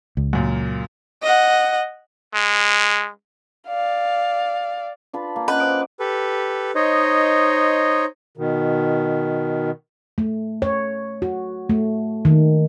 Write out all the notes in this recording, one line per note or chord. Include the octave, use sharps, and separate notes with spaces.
C#2
F#2 A#2
D#5 F#5
G#3
D5 F5
D4 F4 B4
A#3
C#4 B4 D#5 F#5
C5 D#6 D7
G4 A4 B4
D#4 C5 C#5 D#5
B2 D#3
A3
C#5
F#4
A3
D#3